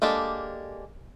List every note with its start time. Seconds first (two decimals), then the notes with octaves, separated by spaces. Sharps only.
0.02 G#3 A#3 D4 G4 A4